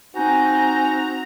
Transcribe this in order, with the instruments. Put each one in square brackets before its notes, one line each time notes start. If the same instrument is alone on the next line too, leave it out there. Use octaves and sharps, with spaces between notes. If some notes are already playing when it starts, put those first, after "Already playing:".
[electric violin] C4 A#5 [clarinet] D#4 [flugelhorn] F#4 [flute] G#5